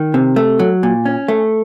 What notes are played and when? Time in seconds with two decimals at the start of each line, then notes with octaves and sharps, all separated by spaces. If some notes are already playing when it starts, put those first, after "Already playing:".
Already playing: D#3
0.14 C3
0.36 A3
0.59 F#3
0.83 A#2
1.05 C#4
1.28 A3